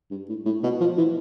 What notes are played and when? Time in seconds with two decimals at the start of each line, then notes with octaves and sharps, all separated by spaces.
0.10 G2
0.29 A2
0.45 A2
0.63 B2
0.80 F3
0.98 E3